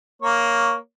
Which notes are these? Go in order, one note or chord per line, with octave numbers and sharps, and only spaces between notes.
A#3 C#5